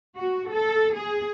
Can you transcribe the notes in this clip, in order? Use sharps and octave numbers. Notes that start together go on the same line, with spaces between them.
F#4
A4
G#4